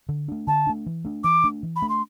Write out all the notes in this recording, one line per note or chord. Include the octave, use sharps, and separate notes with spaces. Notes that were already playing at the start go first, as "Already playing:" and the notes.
D3
A3 D4
D3 A5
A3 D4
E3
A3 D4
E3 D6
A3 D4
E3
B5
A3 D4
C6